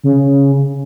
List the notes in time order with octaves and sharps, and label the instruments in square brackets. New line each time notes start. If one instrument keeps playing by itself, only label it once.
[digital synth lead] C#3